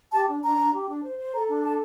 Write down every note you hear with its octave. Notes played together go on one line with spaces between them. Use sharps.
G4 A5
D4
D4 A#5
D4
G4
D4
C5
C5
A4 A#5
D4
A4 A5